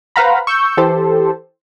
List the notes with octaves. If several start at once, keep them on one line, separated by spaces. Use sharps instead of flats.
B4 C5 F5 F#5 A#5 B5
C#6 E6 G6
E3 G4 A4 C5